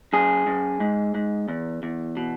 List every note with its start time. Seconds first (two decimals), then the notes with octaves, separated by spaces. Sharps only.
0.13 F#2 G#4
0.47 F#2
0.80 G#2
1.15 G#2
1.48 E2
1.83 E2
2.17 B2